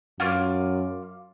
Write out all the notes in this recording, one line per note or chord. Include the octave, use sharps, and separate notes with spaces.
F#2 F4 D6